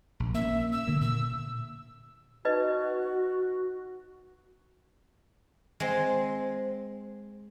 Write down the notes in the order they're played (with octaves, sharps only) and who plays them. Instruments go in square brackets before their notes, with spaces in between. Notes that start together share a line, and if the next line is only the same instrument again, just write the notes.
[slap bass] A#1
[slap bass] A#3 C#4 [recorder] E5
[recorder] E6
[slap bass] D3 A#3
[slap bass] A#2 [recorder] E6
[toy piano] D#4 B4 D#5 [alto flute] F#4
[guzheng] G#3 C4